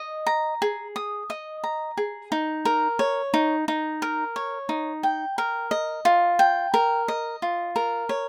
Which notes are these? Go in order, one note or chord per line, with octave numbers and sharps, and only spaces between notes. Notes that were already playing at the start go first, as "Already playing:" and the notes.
Already playing: D#5
A#5
G#4
D#6
D#5
A#5
G#4
D#4
A#4
C#5
D#4
D#4
A#4
C#5
D#4
G5
A#4
D#5
F4
G5
A#4
D#5
F4
A#4
C#5